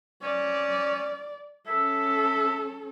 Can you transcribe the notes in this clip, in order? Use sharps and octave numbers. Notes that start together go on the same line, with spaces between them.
C#4 D5
C#4 A4 E5